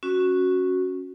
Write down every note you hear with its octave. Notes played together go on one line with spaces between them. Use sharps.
C#4 F#4